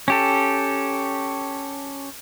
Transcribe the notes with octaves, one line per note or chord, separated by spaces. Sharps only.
C#4 G4 A4